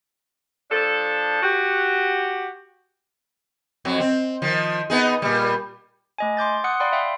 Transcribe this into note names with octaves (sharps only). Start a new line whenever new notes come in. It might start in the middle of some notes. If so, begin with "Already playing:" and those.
F3 D4 A4
F#4 G4
F2 F#3
C4
D#3 F3
B3 D#4 G#4
A#2 G3
A3 D#5 G#5
C6 D6 G6 A6
F#5 D#6 F#6 C#7
D5 F5 G5 B5 C6
E5 F5 G5